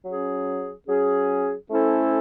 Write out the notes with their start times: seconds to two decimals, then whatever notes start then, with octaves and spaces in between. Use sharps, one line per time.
0.05 F#3 C#4 G#4
0.87 F#3 C#4 G#4
1.70 A3 C#4 E4 A4 C5